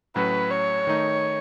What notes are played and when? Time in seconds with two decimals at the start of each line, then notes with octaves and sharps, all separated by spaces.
0.16 A2 F#3 C#4 F#4 B4
0.51 C#5
0.87 D#3 A3 D#4